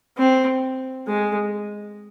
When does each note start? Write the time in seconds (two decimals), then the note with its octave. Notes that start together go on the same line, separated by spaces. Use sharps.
0.18 C4
1.07 G#3